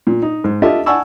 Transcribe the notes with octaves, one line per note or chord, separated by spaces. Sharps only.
A#2
D#4
G#2
F4 G4 A4 D#5 E5 A5
D5 F#5 G#5 A5 C#6 E6